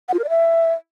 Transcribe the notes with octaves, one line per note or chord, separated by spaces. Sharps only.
F#5
F4
A#4
D5
E5